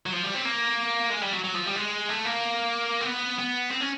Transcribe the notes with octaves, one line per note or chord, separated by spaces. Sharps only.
F#3
F3
G3
C4
A#3
G#3
G3
F#3
F#3
F3
G3
G#3
A3
A#3
C4
B3
B3
C4
C#4